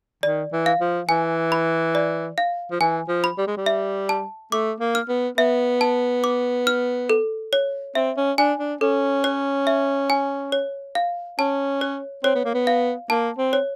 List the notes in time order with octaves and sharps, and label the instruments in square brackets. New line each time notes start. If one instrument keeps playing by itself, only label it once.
[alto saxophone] D#3 [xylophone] D5
[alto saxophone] E3
[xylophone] F5
[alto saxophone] F3
[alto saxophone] E3 [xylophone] G#5
[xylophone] B5
D5
F5
[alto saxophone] F3
[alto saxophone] E3 [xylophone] G#5
[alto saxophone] F3
[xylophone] B5
[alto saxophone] G3
G#3
G3
[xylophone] E5
A5
[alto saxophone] A3 [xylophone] D6
[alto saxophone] A#3
[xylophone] F6
[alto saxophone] B3
[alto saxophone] B3 [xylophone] E5
[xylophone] A5
D6
F6
A4
C#5
[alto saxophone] C4 [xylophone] E5
[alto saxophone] C#4
[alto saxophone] D4 [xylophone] G#5
[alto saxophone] D4
[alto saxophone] C#4 [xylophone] A4
[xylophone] C#5
E5
G#5
C#5
F5
[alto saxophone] C#4 [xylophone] A5
[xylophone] C#5
[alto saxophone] C4 [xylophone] C#5
[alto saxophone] B3
A#3
B3
[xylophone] F5
[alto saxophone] A#3 [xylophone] A5
[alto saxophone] C4
[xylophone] C#5